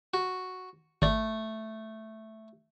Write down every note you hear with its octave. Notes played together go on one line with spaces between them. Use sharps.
F#4
G#1 A3 D5